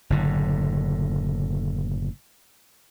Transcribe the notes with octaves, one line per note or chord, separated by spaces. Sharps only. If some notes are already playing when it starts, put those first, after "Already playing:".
F#1 A2 D3